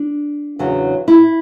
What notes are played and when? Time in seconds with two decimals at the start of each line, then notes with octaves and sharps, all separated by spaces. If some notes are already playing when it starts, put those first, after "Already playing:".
Already playing: D4
0.59 E2 C#3 F#3
1.08 E4